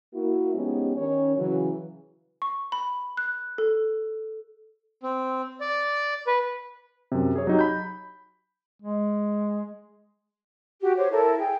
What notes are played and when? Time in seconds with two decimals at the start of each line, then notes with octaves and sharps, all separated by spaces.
0.14 A#3 E4 F#4
0.54 F3 G#3 B3 C#4 D#4 G4
0.97 D#3 C#4 C#5
1.37 C#3 E3 F#3
2.42 C#6
2.72 B5
3.17 F#6
3.58 A4
5.03 C4
5.61 D5
6.27 B4
7.12 F#2 C3
7.36 G#4 C#5
7.47 F#3 D#4 G4
7.59 B5 G6
8.82 G#3
10.81 F#4 G4
10.97 C5 C#5 D6
11.11 E4 A4 A#4
11.39 G#4 G5